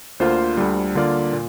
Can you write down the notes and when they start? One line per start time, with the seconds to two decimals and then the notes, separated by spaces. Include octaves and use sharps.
0.20 D2 D3 A#3 F4 C5
0.57 D2 D3 G3
0.95 D3 A#3 F4 D5
1.33 A#2